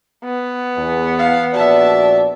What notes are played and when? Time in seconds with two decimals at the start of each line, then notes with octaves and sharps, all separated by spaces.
0.24 B3
0.77 E2
1.19 F5
1.54 A#1 F#4 D5 E5 A5